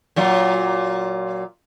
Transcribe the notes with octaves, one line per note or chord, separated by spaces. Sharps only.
A#2 F#3 F4